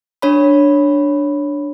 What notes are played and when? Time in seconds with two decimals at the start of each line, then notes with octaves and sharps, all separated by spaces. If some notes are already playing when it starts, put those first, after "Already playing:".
0.22 D4 C#5 B5